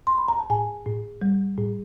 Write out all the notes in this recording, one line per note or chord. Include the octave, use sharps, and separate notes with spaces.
C6
B5
A#5
A5
A2 G#5
A2
G3
A2